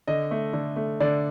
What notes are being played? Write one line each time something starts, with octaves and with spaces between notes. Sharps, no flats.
D3 D#5
A3
D3
A3
D3 D5